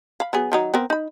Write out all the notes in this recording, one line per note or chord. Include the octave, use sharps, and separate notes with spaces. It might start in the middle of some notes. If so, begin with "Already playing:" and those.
F5 B5
F#3 B3 G#4
D#3 F#3 D#4
B3 C4 A#4
D#4 B5